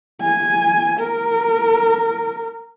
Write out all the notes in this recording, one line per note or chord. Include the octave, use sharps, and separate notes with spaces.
G#5
A#4